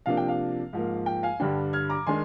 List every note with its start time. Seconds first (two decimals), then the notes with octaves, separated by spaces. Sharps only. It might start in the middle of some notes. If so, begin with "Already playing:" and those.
0.06 C3 F3 A#3 D4 F5
0.17 G5
0.29 F5
0.73 G#2 F3 A#3
1.06 G5
1.23 F5 G#5
1.40 G2 D3 G3 D4 G5
1.73 F6 G#6
1.90 A#5 D6
2.06 D#3 G#3 D4 G#5 C6